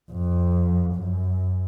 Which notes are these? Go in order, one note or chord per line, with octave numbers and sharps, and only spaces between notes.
F2
F#2